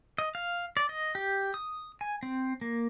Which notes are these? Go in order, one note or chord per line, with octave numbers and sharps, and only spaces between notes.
D#5
F5
D5
D#5
G4
D#6
G#5
C4
A#3